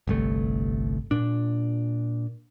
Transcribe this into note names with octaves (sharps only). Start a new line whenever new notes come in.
G1 C2 A3
A#2 D4